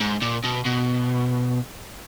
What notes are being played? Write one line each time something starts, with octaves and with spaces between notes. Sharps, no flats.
G#2
A#2
B2
B2